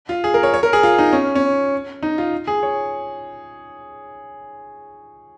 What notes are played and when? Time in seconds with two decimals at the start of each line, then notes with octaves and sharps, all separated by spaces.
0.09 F4
0.24 G#4
0.34 A#4
0.43 C#5
0.54 C#5
0.63 A#4
0.73 G#4
0.83 F4
0.98 D#4
1.13 C#4
1.35 C#4
2.03 D#4
2.18 F4
2.47 G#4
2.63 C#5